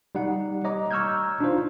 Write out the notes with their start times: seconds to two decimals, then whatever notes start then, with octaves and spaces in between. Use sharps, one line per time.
0.15 G3 D#4 F#5
0.64 C#5 D#5 A#5 D6
0.91 A#5 C#6 E6 F6 G6 G#6
1.40 D4 D#4 F4 C5